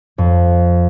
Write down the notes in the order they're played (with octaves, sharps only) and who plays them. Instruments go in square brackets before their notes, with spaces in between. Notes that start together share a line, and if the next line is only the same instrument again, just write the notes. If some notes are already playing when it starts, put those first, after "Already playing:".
[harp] F2